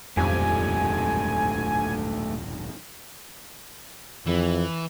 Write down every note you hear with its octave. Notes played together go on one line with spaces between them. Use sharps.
D#1 B1 F2 G#2 A3 D4 G4 G#5
F2 E3